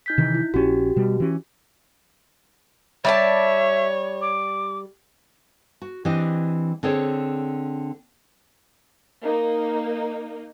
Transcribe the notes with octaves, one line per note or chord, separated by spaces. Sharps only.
D#4 G6 B6
C3 D#3 E3
E4
A#1 C#4 F#4 G4
B2 G3
E3 C#4
G3 C#5 D5 E5 A5
D6
F#4
E3 C4 D4 G4 D#5
D3 C4 G#4 C#5 D5
A#3 D#4